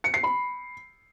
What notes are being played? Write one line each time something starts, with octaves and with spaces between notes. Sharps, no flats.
C#7
C7
B5